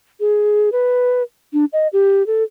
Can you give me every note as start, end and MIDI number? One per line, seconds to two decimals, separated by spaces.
0.20 0.72 68
0.72 1.23 71
1.53 1.65 62
1.73 1.88 75
1.93 2.25 67
2.27 2.43 69